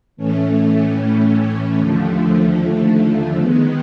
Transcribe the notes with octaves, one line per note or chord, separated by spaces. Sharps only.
A2 E3 A3 C#4
D#2 D3 F3 A3
D#3 G#3 B3